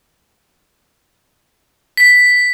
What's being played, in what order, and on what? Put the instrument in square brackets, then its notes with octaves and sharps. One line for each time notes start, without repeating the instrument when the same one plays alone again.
[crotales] B6